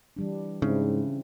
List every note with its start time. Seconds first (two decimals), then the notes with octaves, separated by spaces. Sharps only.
0.17 E3 G3 D4
0.62 G#2 C#3 C4 D4 E4